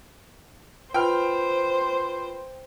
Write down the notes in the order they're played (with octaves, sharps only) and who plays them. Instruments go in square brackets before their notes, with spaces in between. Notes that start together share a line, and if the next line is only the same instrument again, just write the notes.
[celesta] F4 B4 B5 [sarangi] C5 [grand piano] G5 F6